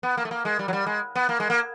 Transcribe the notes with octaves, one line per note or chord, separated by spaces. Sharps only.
B3
A#3
A3
A#3
G#3
G3
F#3
G3
G#3
B3
A#3
G#3
A#3